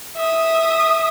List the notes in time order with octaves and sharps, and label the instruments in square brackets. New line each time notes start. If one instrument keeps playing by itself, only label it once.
[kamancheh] E5 D#6